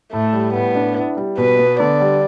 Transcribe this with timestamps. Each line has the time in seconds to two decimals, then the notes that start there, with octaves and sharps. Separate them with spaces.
0.13 A2 A3
0.33 G3
0.54 A2 B3
0.75 D4
0.96 E4
1.17 G3
1.38 B2 B4
1.59 B3
1.80 D3 D5
2.01 G3